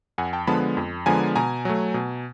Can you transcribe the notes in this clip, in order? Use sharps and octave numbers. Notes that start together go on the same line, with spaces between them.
F2 F#5 G#5
G5 A5
D3 F3 G#3 B3 A5 B5
F2
D3 F3 G#3 B3 G#5 A#5
B2 G#5 A#5
F#3 A3
B2